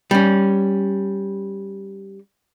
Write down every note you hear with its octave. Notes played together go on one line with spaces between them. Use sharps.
G3 C#4